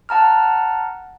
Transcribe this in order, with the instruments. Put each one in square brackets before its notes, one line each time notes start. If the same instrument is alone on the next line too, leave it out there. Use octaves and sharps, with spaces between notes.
[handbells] F#5 A5 A#5 F6